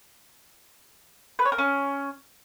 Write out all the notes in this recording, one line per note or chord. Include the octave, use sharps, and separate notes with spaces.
B4
C#5
A#4
C#4